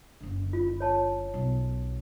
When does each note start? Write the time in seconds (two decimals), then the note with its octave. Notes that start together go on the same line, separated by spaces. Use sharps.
0.21 F#1 D3
0.53 F4
0.80 C#5 A5
1.34 B1